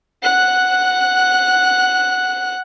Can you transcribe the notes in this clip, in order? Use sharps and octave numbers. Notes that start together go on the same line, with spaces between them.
F#5 F#6